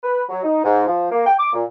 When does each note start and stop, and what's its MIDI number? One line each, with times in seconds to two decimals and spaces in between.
0.03 0.22 71
0.29 0.43 54
0.43 0.60 63
0.64 0.84 44
0.86 1.06 53
1.10 1.23 58
1.25 1.34 79
1.39 1.51 86
1.53 1.62 46